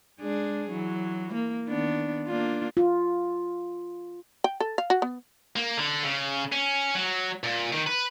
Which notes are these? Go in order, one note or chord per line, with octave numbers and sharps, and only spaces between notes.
G#3 D4 G#4
E3 F#3
A#3
D#3 B3 D4
A#3 D4 F4
F4
G5
A4
F5
F#4
B3
A#3
D3
C#3
C#4
F#3
A#2
D#3
B4